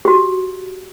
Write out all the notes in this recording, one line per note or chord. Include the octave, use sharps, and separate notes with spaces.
F#4 G4